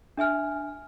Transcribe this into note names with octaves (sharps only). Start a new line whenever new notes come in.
D4 E5 G#5 F6